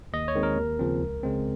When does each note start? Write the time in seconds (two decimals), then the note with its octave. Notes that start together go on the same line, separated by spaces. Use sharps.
0.13 D#2 D#5
0.28 C#5
0.35 D#3 G#3 C4
0.43 A#4
0.57 D#2
0.79 C#3 F3 C4
1.01 C#2
1.23 C#3 G#3 C4